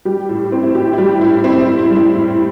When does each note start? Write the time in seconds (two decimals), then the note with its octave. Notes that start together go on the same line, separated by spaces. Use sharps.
0.05 G3 G4
0.29 A2
0.52 C4
0.63 E4
0.75 A2 G4
0.93 E4
0.98 G3 G4
1.21 A2 E4
1.44 C4 E4
1.61 E4
1.67 A2
1.79 E4
1.90 G3
1.96 E4
2.13 A2